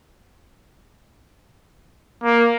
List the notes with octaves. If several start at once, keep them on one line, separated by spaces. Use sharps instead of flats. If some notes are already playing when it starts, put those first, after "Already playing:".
A#3